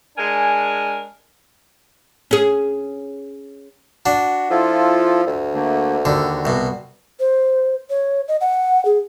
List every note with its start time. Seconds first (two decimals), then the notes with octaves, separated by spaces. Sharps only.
0.17 G#3 D4 A#4 G#5
2.31 C#4 G#4
4.06 D4 F#4
4.50 F3 E4 F4 A4
5.27 D2
5.54 D3 A3 A#3
6.05 D#2 D3 F#4
6.45 C2 B2
7.20 C5
7.90 C#5
8.28 D#5
8.41 F#5
8.85 G#4